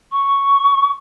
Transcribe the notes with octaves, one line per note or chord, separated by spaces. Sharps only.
C#6